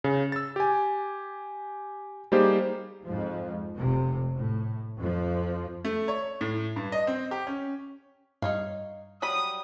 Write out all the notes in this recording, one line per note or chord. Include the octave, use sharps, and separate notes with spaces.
C#3
E6 A6
G4 G#5
G3 A#3 D#4 G4 G#4 C5
F2 G#2 F3
F1 C3
A2
F2 F3
A3
C#5
A2
G2
D#5
C4
G4
C#4
G2 D#4 C#5 F5
F#3 G3 B5 D#6